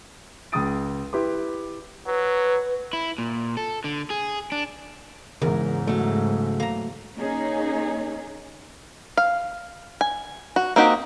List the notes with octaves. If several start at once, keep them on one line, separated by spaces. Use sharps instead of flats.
C#2 G#3 G5 D#6 A6 D7
E4 G4 B4 C6 D6
F#3 B4
E4
A#2
A4
D3
G#4
D4
E2 G#2 C#3 A#4
F#3 A3
A#3 A#5
A#3 C#4 D#4 G#4
F5
G#5
F#4
A#3 C4 D#4 F#4 G4